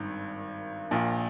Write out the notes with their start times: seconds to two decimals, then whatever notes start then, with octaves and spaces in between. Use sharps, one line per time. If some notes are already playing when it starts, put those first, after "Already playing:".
Already playing: G#1 G2 D#3
0.91 A#1 A#2 F3